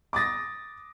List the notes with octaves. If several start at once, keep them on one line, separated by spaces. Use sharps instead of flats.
D6 D#6 A6 A#6